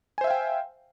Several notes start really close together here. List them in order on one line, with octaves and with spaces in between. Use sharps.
G#5 C5 E5 F5 G5